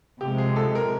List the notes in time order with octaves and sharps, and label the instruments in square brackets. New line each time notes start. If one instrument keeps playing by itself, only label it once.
[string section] C3 F3 G#3 [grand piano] G4
[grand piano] G#4
A4
A#4